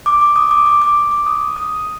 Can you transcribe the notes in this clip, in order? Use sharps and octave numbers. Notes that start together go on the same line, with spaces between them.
D6
D6
D#6
D6
D6
D6
D6
D#6
D#6